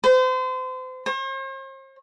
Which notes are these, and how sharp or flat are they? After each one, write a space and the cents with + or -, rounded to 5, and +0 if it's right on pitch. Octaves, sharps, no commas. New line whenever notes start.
C5 -35
C5 +45